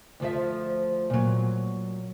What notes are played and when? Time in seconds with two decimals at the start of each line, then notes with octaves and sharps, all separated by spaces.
0.20 D2 F3 E5
1.10 A#2 F#3